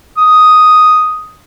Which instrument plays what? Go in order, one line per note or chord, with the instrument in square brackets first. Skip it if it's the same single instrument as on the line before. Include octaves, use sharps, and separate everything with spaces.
[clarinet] D#6